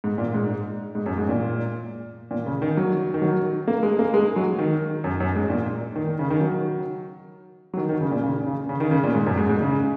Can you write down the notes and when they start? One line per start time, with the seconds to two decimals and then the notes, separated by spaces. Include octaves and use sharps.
0.04 G#2
0.18 A#2
0.34 G#2
0.95 G#2
1.06 F#2
1.18 G#2
1.29 A#2
2.31 A#2
2.46 C#3
2.62 D#3
2.77 F#3
3.14 D#3
3.22 F#3
3.68 A#3
3.83 G#3
3.99 A#3
4.14 G#3
4.36 F#3
4.58 D#3
5.04 F#2
5.20 F#2
5.35 G#2
5.50 A#2
5.96 D#3
6.07 D#3
6.19 C#3
6.30 D#3
6.41 F#3
7.74 F#3
7.77 D#3
7.89 D#3
8.01 C#3
8.11 A#2
8.23 C#3
8.47 C#3
8.69 C#3
8.80 D#3
8.91 C#3
9.03 A#2
9.15 G#2
9.26 F#2
9.37 G#2
9.49 G#2
9.61 C#3